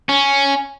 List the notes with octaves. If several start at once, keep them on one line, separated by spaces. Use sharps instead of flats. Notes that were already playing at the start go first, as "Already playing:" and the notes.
C#4